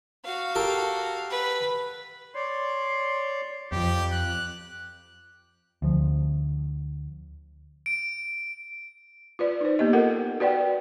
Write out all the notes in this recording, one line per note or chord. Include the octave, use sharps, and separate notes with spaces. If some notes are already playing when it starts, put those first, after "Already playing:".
F#4 F5
G4 A4 A#4
B4
C#5 D5 C6
F2 F3 G4
F#6
D2 F3
D7
F4 B4 D5
D#4 C5
A#3 B3 G4 D#5
F4 A4 A#4 F#5
F#4 B4 D5 F#5 G5